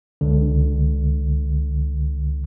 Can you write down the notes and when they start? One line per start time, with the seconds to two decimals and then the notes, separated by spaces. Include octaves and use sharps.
0.21 C#2 D3